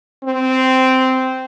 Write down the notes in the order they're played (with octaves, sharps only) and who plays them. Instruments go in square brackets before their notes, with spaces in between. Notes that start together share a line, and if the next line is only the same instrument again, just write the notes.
[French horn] C4